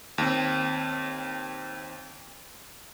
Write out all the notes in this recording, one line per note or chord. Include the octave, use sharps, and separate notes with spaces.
D#2 C4